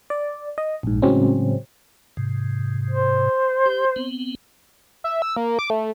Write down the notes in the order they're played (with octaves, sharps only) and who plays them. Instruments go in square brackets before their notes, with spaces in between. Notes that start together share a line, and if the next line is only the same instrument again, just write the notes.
[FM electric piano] D5
D#5
A#1 G#2
A2 C#3 F#3 G#3 C4 C#4
[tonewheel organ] G#2 C3
[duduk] C5
[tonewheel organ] G4
B3 C4
[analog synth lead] E5
E6
A#3
D6
A3